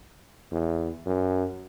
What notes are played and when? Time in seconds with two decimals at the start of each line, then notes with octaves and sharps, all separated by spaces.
0.52 E2
1.07 F#2